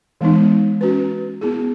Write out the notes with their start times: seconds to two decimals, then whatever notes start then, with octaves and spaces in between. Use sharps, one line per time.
0.21 E3 G#3 B3 D#4
0.81 C#4 F#4 B4
1.41 B3 E4 G#4